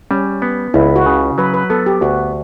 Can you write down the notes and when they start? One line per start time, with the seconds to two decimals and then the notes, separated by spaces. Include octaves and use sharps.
0.11 G3 C#4
0.42 B3
0.74 C#2 E4
0.96 F#4
1.06 C#3
1.38 F#3 B4
1.54 B4
1.70 B3 A4
1.86 G4
2.01 D2 F#4